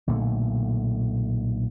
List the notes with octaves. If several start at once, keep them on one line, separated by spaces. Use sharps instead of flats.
B1 A#2 D3 A3